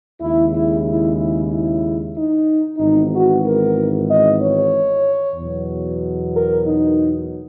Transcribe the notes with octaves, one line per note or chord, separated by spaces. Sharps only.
D#2 C#3 G#3 E4
E4
E4
E4
E4
D#4
G#1 G#2 E3 B3 D#4
F#4
A#4
D#5
C#5
E2 B2 F#3
A#4
D#4